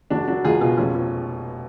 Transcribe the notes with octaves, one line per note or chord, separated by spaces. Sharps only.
C#2 D4 F#4
F#3 D4 F#4
C#2 F4 G#4
B2 F4 G#4
F1 C#4 F4
F3 C#4